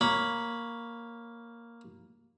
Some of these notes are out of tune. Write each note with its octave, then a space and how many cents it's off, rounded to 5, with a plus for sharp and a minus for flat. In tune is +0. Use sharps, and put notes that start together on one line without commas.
A#3 +0 C#5 +0 B5 -10